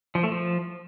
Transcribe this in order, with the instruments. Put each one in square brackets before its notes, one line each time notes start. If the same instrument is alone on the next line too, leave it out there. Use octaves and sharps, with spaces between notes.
[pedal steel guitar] F3
A3
F3